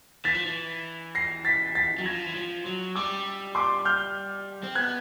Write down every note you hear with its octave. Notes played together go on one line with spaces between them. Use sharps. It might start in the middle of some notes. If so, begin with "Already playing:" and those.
E3 A6 B6
F3
E3
A#6 C7
A6 B6
A6 B6
F#3
F3 G#6 A#6
E3
F3
F#3
G3 D6 E6
C6 D6
F6 G6
C4
B3 F#6 G#6